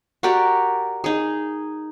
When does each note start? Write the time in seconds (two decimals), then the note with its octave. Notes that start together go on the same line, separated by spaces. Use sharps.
0.23 F#4 G4 A#4 D5
1.04 D#4 G#4